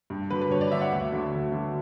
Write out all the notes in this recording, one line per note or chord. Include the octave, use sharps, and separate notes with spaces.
G2
D3 F#3 B4
B4
G2 C#5
D5
D3 F#3 E5
F#5
D2 E5
D3 F#3
D2
D3 F#3